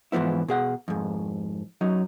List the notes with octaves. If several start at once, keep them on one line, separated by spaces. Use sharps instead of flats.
G#2 E3 F3 B3 E4
B2 G#4 F#5
F2 G#2
F#2 F#3 D#4